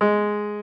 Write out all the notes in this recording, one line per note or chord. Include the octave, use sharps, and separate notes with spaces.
G#3